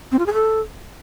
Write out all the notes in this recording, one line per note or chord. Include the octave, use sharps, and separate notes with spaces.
C4
F4
G#4
A4